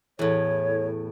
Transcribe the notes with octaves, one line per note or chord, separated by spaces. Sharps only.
E2 A2 C#5